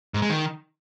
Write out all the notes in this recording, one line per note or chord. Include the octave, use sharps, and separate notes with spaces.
G#2
G#3
D#3